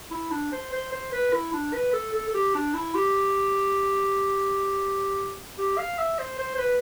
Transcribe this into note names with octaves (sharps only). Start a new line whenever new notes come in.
E4
D4
C5
C5
C5
B4
E4
D4
B4
A4
A4
A4
G4
D4
E4
G4
G4
F5
E5
C5
C5
C5
B4